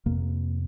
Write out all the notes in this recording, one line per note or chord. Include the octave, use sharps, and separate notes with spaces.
F2 C3 A#3